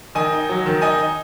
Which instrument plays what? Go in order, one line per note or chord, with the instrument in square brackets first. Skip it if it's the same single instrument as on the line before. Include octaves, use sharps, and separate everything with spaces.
[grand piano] D#3 D#5 G#5
D#4
F#3
D#3
D#4 D#5 G#5
D#4